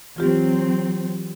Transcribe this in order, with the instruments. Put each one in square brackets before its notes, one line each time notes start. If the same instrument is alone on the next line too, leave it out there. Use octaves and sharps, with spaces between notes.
[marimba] E3 F4 G4 [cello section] F#3 C4